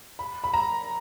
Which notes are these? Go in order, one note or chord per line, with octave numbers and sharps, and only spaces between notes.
B5
B5
A#5